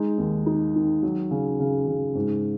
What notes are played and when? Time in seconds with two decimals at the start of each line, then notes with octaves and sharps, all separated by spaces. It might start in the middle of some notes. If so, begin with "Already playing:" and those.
Already playing: G#3 D#4
0.18 D#2
0.46 D#4
0.76 D#3
1.03 F#3
1.31 C#3
1.60 C#3
1.87 C#3
2.15 G#2